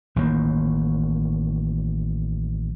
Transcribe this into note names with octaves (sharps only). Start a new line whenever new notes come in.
A1 D#3 A#3